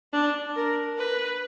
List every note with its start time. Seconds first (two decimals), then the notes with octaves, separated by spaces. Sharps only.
0.13 D4
0.56 A#4
0.98 B4